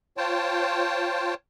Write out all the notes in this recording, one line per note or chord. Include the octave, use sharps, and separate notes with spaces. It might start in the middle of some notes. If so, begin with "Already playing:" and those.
F4 C5 C#5 G5 A5